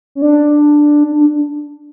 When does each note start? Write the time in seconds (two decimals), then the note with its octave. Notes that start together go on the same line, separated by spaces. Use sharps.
0.15 C#4
0.22 D4
1.12 D4